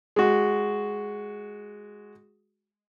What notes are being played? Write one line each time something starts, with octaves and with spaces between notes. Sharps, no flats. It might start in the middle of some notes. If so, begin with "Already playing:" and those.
G#3 F#4